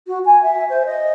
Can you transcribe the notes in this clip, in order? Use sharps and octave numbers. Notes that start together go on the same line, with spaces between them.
F#4
G#5
E5
C5
D#5